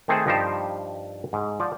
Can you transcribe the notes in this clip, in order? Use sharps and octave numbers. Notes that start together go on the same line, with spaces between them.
D#3 A3 C4 G#4 A4 C5
G2 F3 D#4 G4 C5 A5
G#2
F3 C5 D5